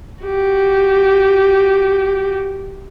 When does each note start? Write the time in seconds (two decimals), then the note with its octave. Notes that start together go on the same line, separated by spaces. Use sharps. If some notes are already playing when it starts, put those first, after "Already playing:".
0.23 F#4 G4